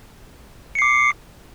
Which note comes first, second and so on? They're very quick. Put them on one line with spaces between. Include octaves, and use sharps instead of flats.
C#7 C7 D6